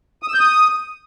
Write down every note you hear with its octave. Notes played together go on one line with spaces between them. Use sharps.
D#6
E6
G6
D#6